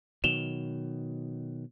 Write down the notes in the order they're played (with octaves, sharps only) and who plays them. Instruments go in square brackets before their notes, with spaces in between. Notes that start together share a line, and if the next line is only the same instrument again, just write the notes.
[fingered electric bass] B2 D#3 F#3 [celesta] E7 F7 G7